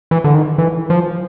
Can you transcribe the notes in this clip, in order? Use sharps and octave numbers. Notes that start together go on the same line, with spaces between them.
E3
D3
D#3
E3
F3